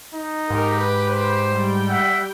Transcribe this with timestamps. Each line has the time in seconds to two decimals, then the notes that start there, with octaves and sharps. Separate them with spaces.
0.15 D#4
0.50 G#2 G4 A#4
0.80 B4
1.09 C5
1.52 G3 G5
1.90 E5 F#5